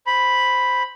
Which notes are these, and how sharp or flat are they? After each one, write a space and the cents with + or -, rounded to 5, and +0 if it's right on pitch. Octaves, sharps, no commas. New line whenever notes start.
C5 +0 B5 +0